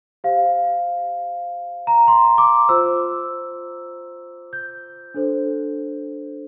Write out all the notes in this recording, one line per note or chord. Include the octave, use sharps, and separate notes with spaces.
G4 C5 F5
A#5
C6
D6
F4 C5 E6
G6
D4 A4 C5